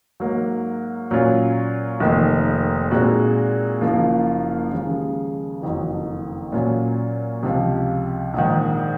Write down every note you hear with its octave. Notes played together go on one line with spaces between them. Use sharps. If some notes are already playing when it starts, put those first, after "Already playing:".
G#2 F#3 A#3
A#2 F#3 C#4 F4
F1 F2 D#3 A#3
A#2 G#3 C4 D#4 F#4
F#1 F#2 F3 A#3 F4
D#2 C#3 F3 G#3
F#1 F2 D#3 F#3
A#2 F#3 C#4 F4
C#2 C3 F3
A#1 G#2 D#3